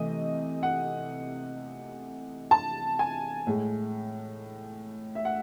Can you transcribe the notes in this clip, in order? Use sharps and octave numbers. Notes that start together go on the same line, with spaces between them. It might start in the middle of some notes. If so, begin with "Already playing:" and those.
Already playing: C3 E3 A3 D#5
F#5
A5
G#5
A2 G#3
E5
F#5